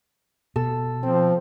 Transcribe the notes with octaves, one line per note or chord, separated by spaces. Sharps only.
B2 A4
F3 C4